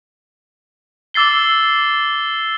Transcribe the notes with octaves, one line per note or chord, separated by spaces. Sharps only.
D6 E6 A6 C7 G7